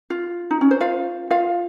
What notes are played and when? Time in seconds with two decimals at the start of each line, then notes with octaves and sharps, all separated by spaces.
0.10 F4
0.51 D#4
0.61 C#4
0.71 C5
0.80 F4 F5
1.30 F4 F5